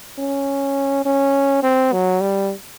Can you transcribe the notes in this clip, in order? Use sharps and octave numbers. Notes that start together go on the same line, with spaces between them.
C#4
C#4
C4
F#3
G3